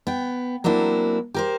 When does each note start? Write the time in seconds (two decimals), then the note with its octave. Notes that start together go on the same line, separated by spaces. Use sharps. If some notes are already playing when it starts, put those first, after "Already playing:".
0.07 B3 G5
0.64 F#3 A#3 C4 D4 E4
1.34 G4 A#4 C5